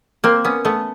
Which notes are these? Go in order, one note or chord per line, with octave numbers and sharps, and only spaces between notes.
A#3 C4
B3 C#4
A3 B3